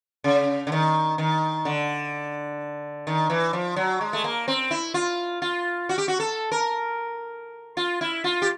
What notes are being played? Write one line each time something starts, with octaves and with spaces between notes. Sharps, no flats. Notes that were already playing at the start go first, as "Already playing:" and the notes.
C#3
D3
D#3
D#3
D3
D#3
E3
F3
F#3
G#3
A3
A#3
C4
E4
F4
F4
F#4
G4
F#4
A4
A#4
F4
E4
F4
G4